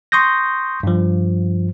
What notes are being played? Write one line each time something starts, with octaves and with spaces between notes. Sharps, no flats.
C6 C#6 D#6 G6 A#6
G2 F3